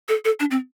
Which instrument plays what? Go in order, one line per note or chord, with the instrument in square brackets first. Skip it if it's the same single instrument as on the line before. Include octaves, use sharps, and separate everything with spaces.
[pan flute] A4
A4
D4
C4